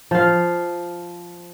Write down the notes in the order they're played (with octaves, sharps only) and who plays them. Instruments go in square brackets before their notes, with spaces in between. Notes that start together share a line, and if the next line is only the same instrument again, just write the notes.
[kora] F3 F5